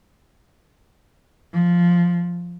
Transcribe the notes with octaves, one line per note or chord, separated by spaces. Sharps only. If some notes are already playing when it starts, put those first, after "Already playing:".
F3